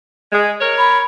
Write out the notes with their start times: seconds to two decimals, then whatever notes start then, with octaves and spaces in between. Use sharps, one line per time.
0.32 G#3
0.59 A#4 C#5
0.78 B5